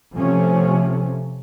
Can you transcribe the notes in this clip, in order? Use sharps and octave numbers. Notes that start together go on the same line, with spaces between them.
C3 F3 A3 C#4